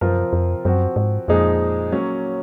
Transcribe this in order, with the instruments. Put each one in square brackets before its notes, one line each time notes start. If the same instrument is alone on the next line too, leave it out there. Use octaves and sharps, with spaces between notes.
[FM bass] F#2 [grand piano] C3 F3 C4 F4 A#4
[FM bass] F2
[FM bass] F#2 [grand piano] F3 C4 F#4
[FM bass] G#2
[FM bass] F2 [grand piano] A#2 F3 G#3 D#4 G#4
[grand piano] F#3 A#3 C#4